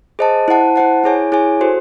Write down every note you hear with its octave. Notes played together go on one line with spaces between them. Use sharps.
G#4 C5 D#5 A5
E4 C5 F#5 A5
E4 C5 F#5 A5
E4 G#4 C#5 G#5
E4 G#4 C#5 G#5
F#4 A4 C5